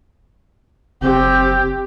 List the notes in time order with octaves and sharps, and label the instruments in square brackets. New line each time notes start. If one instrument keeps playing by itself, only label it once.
[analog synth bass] F#1 [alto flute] C4 [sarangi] G4